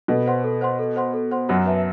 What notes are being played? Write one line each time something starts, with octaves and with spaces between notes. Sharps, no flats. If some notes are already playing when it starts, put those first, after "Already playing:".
B2 B3 A4
C5 F#5 C6
A4
C5 F#5 C6
A4
C5 F#5 C6
A4
C5 F#5 C6
F#2 F#3 F#4
B4 E5 A5